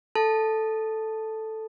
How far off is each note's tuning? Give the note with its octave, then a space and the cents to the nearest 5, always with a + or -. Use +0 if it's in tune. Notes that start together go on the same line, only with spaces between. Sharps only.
A4 +0 A5 +0